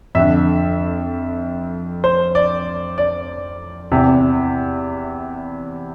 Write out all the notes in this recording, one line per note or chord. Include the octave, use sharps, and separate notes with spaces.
F2 D3 E5
C5
D5
D5
E2 C3 E3